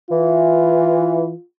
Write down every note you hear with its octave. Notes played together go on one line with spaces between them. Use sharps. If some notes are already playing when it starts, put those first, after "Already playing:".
E3 F4